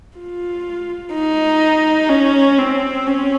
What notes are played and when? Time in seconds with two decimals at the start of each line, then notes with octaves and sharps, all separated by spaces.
0.18 F4
1.14 D#4
2.10 C#4
2.58 C4
3.07 C#4